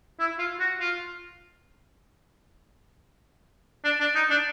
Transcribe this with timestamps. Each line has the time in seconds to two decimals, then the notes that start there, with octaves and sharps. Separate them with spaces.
0.19 E4
0.39 F4
0.60 F#4
0.80 F4
3.84 D4
4.00 D4
4.15 D#4
4.30 D4